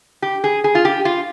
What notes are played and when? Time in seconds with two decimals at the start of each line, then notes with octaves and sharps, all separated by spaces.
0.22 G4
0.44 G#4
0.64 G#4
0.75 F4
0.85 G4
1.05 F4